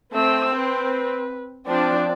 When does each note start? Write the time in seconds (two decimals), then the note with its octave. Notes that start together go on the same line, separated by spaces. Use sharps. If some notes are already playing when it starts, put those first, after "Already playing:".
0.14 A3 C4 E6
0.56 B4
1.67 F3 C4 D4 D5